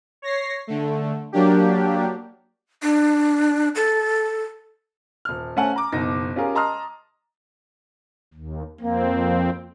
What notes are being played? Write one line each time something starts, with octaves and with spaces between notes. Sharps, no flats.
C#5 A#6 C7
D3 A3
F#3 A#3 D4 G4
D4
A4
D#1 F6
A3 C#4 C5 F#5 G#5 A5
A#5 D6
F#1 B2 D#4 A#6
C#4 F4 G4 G#4 A#4
D#5 A5 A#5 C6 D#6 F6
D#2
F2 A#3 C4